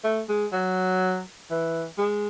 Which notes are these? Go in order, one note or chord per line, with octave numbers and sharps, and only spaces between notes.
A3
G#3
F#3
E3
G#3